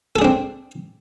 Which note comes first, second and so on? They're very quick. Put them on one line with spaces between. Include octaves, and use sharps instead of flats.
A4 G#4 D4 C4